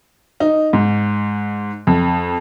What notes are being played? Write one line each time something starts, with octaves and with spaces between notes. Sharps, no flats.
D#4
G#2
F2